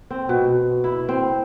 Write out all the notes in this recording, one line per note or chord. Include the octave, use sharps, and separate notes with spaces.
C4
B2
E4
C4